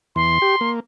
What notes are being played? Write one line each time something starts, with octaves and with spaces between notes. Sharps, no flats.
E2 C6
G4
A#3